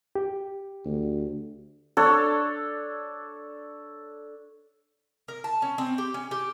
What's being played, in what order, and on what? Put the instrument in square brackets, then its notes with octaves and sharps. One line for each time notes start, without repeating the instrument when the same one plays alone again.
[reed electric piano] G4
[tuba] D2
[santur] D4 A4 C#5
[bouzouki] A#4
A5
C#4
C4
G4
C#4
G4